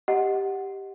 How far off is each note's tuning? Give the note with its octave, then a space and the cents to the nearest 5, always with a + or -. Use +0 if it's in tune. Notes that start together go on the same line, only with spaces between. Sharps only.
G4 +0 D#5 +10 F#5 +0